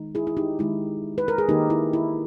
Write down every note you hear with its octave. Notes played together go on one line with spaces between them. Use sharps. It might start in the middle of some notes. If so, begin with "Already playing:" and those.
Already playing: D#3 G#3 D#4
E4 G#4
E4
D#4 G4
D#3 G#3 D#4 E4
B4
A#4
G#4
D#3 A#3 D#4 G4
E4
E4